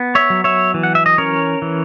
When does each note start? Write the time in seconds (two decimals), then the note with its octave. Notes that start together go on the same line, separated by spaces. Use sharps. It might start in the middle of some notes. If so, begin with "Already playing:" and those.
Already playing: B3
0.15 C#5 E5
0.30 F#3
0.44 C#5 E5
0.74 E3
0.83 F#5
0.95 E5
1.06 D#5
1.18 C#4 A#4 C#5
1.62 E3